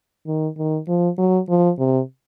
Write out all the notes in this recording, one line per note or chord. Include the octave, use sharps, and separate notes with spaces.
D#3
D#3
F3
F#3
F3
C3